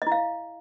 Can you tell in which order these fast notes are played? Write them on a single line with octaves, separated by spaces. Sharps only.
D#5 E4 F5